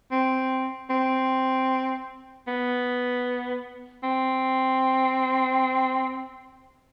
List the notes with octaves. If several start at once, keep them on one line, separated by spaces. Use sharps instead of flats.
C4
C4
B3
C4